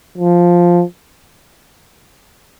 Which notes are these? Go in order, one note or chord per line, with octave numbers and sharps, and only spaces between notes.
F3